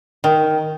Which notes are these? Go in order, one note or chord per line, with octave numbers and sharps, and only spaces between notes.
D#3